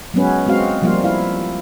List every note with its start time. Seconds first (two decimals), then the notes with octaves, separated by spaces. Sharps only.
0.14 F#3 G#3 B3 C#4 B4
0.46 G#3 C4 F#4 F5
0.82 F3 G3 A#3 F4 F5
1.04 E4 F5